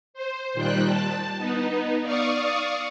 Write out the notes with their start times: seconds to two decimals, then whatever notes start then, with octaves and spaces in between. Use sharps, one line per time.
0.14 C5
0.54 A#2 D#3 G3 G5 F#6
0.86 A5
1.38 B3 D#4
2.02 D5 F5 C#6 D#6